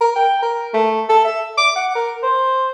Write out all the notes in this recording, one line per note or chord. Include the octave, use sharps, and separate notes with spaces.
A#4
G5
A#4
A3
A4
E5
D6
F#5
A#4
C5